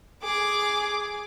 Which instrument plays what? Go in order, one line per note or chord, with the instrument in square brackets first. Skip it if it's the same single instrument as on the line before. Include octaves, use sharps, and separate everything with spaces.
[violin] G#4 D6